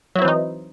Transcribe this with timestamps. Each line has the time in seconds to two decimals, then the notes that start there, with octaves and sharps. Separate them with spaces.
0.15 F#3
0.19 E4
0.22 C4
0.25 E3
0.28 D#4